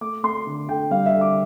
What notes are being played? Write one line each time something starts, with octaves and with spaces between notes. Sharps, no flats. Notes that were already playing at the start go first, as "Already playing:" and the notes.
A3 D6
A3 C6
D3
D3 G5
G3 F5
E5
D3
D6